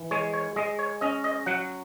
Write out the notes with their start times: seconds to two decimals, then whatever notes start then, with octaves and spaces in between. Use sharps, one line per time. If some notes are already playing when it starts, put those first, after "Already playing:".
Already playing: E3
0.11 G#3 C#5
0.33 C#5
0.56 G#3 D#5
0.79 C#5
1.01 C#4 D#5
1.24 D#5
1.46 F#3 F#5